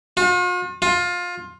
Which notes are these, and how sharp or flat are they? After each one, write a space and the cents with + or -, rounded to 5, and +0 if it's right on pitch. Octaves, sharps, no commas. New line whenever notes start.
F4 +45
F4 +20